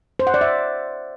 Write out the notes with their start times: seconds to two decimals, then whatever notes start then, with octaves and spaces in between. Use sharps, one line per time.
0.19 C5
0.27 F#5
0.34 D5
0.41 E5